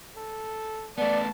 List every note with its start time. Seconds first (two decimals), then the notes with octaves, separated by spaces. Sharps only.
0.17 A4
0.98 A3 B3 D5 A5